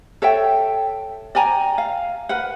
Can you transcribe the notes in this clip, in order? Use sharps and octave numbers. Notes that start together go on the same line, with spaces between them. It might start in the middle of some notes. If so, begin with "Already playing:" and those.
A4 C#5 E5 G5
D5 G5 G#5 A#5
F5
A#4 B4 F#5